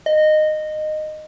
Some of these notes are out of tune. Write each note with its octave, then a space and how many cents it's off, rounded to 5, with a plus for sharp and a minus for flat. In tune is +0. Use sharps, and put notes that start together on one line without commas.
D#5 -15